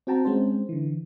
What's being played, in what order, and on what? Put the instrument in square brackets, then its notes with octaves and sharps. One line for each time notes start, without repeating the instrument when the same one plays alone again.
[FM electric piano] C4 F#4 G5 A5 A#5
G#3 C4 C#4 C5
D3 E3